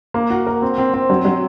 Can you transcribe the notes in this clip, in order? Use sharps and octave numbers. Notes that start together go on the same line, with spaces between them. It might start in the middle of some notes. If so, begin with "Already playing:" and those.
A#3
F#4
A#4
C4
C4
C4
F#3
F#3